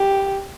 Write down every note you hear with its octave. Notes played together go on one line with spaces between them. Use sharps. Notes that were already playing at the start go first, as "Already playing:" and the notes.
Already playing: G4